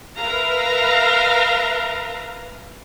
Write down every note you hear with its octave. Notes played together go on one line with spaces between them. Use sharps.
A#4 B4 E5 F5 A#5